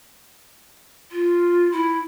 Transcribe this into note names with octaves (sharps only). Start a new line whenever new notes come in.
F4
E4